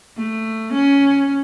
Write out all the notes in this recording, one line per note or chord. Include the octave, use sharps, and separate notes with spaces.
A3
C#4